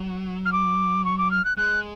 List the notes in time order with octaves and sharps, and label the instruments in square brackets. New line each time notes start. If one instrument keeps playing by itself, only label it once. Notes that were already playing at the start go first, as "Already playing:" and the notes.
Already playing: [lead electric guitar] F#3
[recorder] F6
D6
C#6
D6
F6
F#6
[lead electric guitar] G#3 [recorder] F#6